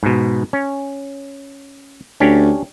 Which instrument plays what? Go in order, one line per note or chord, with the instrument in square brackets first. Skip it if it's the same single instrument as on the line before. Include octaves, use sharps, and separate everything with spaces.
[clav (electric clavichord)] G#2 B2
C#4
[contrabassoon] D2 [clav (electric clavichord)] C#4 D4 G4